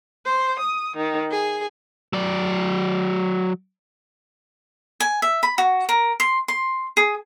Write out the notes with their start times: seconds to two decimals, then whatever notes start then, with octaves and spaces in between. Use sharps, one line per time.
0.25 C5
0.60 D#6
0.96 D#3
1.31 G#4
2.13 F#3 D5
5.00 G#5
5.22 E5
5.43 B5
5.58 F#4
5.89 A#4
6.20 C6
6.48 C6
6.97 G#4